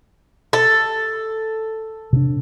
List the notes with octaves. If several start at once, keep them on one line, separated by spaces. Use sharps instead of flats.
A4
C3 D4